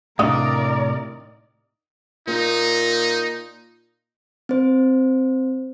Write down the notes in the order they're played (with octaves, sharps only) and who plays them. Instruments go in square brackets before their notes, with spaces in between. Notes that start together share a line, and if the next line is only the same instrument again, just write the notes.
[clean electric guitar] A2 C3 [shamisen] D#3 D4 F5 [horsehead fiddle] A#4 D5 [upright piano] D#6
[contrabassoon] A#2 [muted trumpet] D#4
[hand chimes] C4 C5